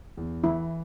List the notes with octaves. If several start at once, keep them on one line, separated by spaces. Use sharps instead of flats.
E2
E3 E4